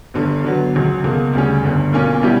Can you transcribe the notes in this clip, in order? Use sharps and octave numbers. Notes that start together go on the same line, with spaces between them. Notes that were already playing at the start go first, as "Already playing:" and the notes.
G1 G2 D3
D3 F#3 B3
C#2 C#3 F#3
C#2 B2 A#3
D2 C#3 G3 C#4
G1 G2 D3
B1 A#2 A#3 C#4
B2 G3 C#4 E4 G4